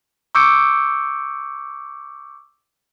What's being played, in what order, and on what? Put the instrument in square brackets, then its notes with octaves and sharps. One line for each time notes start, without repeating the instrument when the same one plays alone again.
[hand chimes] C#6 D6 E6 G6 C#7 D7